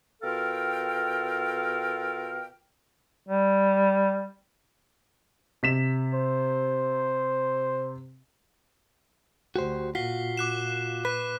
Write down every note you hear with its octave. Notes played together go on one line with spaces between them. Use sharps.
B2 F4 A4 A#4 F5 G5
G3
C3 B6 E7
C5
D2 F#4 G4 C5
A#2 F4 F#4 B6 C7 G7
D6 F#6 E7
B4 F#6 B6